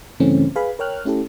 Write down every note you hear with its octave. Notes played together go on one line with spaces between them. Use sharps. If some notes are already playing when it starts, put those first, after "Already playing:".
G2 C#3 E3 A3 C4 C#4
G#4 B4 F5 G#5 B5
A#4 C#5 G5 F6 F#6
A3 C#4 E4 G4 A4